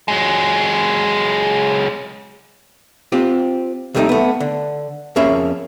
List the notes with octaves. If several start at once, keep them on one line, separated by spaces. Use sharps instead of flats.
F#3 G#3
C4 F4 G4
D#2 C3 G3 A3 B3 D#4
A3 B3
D3
F2 A#3 C#4 G#4 E5 B5